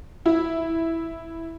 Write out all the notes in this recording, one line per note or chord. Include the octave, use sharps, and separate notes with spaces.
E4